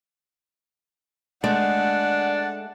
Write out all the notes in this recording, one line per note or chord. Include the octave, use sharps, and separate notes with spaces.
G#3 A3 D4 F#5